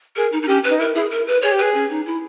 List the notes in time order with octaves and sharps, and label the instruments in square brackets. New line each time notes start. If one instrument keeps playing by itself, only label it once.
[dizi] G#4 [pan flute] A#4
[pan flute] D#4
D#4
[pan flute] C#4 [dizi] G4
[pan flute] B4
[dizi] D#4
[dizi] E4 [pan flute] A#4
[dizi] E4 [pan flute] G#4
[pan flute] A#4
B4
[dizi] G#4 [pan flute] C#5
[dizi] G4
[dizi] G#4 [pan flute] B4
[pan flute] C#4
D#4
E4